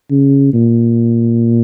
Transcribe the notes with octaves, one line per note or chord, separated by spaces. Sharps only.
C#3
A#2